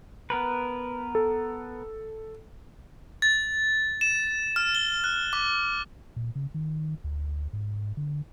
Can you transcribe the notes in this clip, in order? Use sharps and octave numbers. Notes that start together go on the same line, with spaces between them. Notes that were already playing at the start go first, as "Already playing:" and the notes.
B3 A#4 B4
A4
A6
E7
F6
G7
F#6
D6
A#2
C#3
D#3
D2
G#2
D3